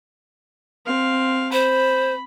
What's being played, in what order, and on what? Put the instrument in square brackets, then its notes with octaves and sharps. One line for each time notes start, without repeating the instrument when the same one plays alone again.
[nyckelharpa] C4 F5
[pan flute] C5 [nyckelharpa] B5